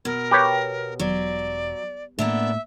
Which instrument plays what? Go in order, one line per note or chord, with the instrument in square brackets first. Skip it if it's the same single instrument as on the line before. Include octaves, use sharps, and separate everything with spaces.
[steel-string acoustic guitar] B2 [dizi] A#4
[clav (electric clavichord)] G4 B4 C#5
[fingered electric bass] E1 [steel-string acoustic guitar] F#3 [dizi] D5
[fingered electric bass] A2 [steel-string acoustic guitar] A#3 B3 D4 [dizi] E5